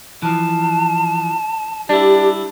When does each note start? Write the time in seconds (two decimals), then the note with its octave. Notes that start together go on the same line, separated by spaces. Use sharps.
0.23 E3 F3 A5
1.89 G3 D4 E4 G4